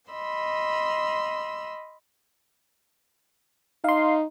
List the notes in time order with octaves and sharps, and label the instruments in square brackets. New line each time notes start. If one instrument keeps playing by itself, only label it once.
[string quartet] D#5 B5 C6 E6
[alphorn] D#4 [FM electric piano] F5 C6